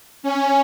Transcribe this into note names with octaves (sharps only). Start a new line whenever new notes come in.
C#4